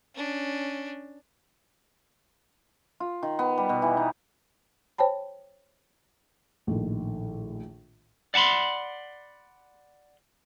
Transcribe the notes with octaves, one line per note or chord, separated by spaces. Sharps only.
C#4 D4
F4
D#3
B3
G3
B2
E3
D#4
C5 C#5 G5 A5 B5
A#1 A2 D#3
D5 F#5 A5 B5 C6